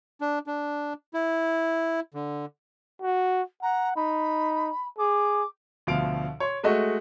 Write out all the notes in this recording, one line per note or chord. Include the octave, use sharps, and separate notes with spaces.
D4
D4
E4
D3
F#4
F#5 A#5
D#4 B5
G#4 D6
D2 B2 F3 F5 D7
C#5 C6
G#3 A3 F#4 D#5